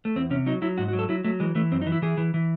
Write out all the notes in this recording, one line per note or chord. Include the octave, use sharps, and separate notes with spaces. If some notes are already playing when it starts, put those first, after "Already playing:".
A3
E2 C4
C3 C#4
F#3 D#4
F#3 E4
G#2 F#4
F#4
F#3
A4
F#3 E4
F#3 A3
E3 G#3
E3 A3
F#2 C4
D#4
E3
E4
E3 G#4
E3
E3